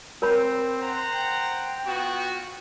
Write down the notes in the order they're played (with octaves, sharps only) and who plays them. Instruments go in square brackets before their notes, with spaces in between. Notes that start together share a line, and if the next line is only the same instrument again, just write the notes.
[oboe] C4 [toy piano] A#4 C#5 B5
[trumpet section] C5 F#5 A#5
[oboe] G5
[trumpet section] B3 F4 F#4